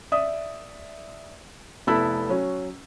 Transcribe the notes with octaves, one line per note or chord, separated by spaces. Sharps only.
D5 E5 D#6
F1 B3 E4 A4 B5 E6
F#3 C#4